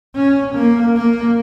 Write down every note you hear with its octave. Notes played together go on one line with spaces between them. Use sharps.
C#4
A#3
A#3